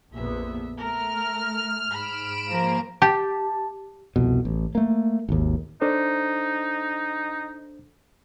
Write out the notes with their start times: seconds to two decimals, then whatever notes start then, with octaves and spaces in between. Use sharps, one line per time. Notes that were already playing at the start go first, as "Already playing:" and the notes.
0.13 A#1 F2 B3 E5
0.78 A3 A#4 F6
1.90 G#2 B5 D7 E7
2.48 F3 A#3 A#4
3.02 G4 A5
4.16 C2 F2 B2
4.45 A1
4.75 A3 A#3
5.29 G#1 D#2
5.81 D4 D#4 A4 C5